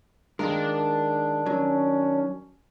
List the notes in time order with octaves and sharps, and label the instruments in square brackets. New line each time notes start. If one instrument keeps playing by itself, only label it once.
[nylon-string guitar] D#3 F4 A#4 [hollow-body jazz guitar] G#3 [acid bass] D4
[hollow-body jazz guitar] F#3 [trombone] C#4